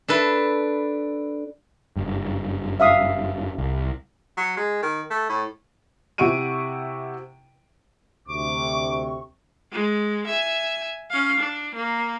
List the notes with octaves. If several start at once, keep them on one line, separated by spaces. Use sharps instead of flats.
D4 A4 B4
F#1 G2
E5 F5 D#6
C2
F#3
G#3
D#3
A3
A2
C3 E4 F#5 C#6 D7 D#7
D2 C3 C#6 D6
G#3
E5 G#5
C#4 F5
D4
A#3